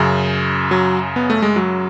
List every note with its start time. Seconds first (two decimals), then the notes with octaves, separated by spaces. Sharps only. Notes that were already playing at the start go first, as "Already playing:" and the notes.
Already playing: F#2 C#3
0.71 F#3
1.16 B3
1.30 A3
1.42 G#3
1.56 F#3